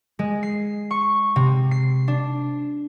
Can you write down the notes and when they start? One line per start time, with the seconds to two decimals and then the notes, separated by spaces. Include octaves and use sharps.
0.19 G#3
0.43 C7
0.91 C#6
1.36 C3
1.71 C7
2.08 D4